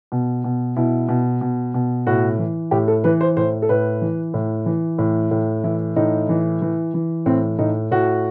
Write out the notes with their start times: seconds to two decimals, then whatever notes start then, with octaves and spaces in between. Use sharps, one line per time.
0.12 B2
0.44 B2
0.76 B2 E4
1.09 B2
1.41 B2
1.74 B2
2.07 A2 F#4
2.39 E3
2.71 A2 G4
2.88 A4
3.04 E3 B4
3.21 C5
3.37 A2 C5
3.62 A4
3.69 A2 B4
4.02 E3
4.34 A2
4.66 E3
4.98 A2
5.31 A2
5.64 E3 E4
5.96 A2 D#4
6.29 E3
6.62 E3
6.94 E3
7.26 A2 C4
7.59 A2 D#4
7.91 A2 F#4